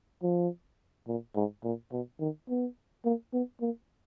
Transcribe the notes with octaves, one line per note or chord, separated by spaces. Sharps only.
F3
A#2
G#2
A#2
B2
D#3
B3
A#3
B3
A#3